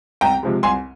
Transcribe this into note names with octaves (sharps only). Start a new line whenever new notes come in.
C2 G5 A#5
C3 F3 G#3
C2 G#5 C6